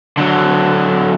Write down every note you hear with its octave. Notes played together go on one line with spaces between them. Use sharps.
D3 F#3